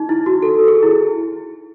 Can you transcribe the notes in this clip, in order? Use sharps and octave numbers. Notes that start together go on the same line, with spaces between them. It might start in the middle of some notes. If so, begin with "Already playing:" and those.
Already playing: D#4
E4
F#4
A4
G#4
E4